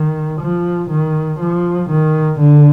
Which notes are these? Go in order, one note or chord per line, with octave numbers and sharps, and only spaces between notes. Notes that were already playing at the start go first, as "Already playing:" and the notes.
Already playing: D#3
F3
D#3
F3
D#3
D3